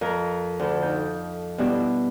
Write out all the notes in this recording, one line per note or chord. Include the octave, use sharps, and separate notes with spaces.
F2 A#4
D2 A4
D#4 G5
B2 G3 D4 E4 F#4